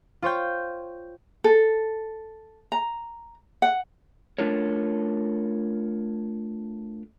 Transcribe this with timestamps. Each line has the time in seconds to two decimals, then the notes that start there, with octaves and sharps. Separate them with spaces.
0.22 F4 C5 C#5 G5
1.44 A4
2.72 A#5
3.62 F#5
4.38 A3 D4 F4 A4 A#4 C#5